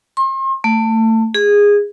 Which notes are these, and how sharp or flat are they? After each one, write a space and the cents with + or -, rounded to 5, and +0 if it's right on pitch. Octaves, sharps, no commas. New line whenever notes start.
C6 +40
A3 +25
G#4 -15